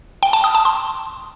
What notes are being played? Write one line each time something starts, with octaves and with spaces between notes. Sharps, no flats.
G5
A5
D#6
A5
C6